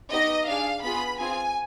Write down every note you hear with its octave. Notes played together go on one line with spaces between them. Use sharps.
B3 D#4 G4 D#5
D4 G#4 F5
B3 F4 G#4 B5
C4 F4 G#4 G#5